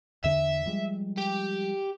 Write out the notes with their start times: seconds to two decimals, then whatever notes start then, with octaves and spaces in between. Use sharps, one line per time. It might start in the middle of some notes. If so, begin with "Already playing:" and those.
0.24 E2 D3 D4 E5
0.66 F3 G3 G#3
1.17 G4